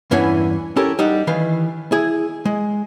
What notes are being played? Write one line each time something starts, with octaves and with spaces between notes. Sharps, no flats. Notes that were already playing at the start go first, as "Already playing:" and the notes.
E2 G2 E3 C#4 E4 F#5
C#4 E4 G4 A4 A#4
G3 D#4 F#5
D#3 E3 B4 F5
E4 G#4
G#3